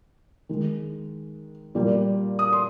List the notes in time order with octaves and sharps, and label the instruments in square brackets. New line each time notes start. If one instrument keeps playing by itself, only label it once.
[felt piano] D#3 G#3
A#2 G3 A#3
D#6
C6